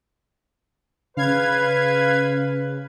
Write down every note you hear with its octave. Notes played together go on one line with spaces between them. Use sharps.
C#3 B4 F5 G#6